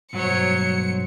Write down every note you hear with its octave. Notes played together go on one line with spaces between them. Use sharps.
B1 G2 F#3 C5 C#5 F#5 C#7